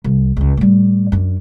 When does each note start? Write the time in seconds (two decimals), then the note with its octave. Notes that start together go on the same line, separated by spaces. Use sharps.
0.04 C2
0.37 C#2 C#3
0.57 A2 G3
1.12 F#2 D4